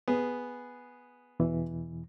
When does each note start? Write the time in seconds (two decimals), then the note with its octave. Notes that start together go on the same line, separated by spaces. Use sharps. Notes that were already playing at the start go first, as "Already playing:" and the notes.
0.08 B3 G#4
1.40 E2 B2 E3